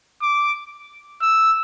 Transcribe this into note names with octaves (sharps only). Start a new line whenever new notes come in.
D6
E6